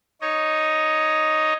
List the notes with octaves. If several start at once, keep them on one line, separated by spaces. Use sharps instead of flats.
D#4 C#5 D#5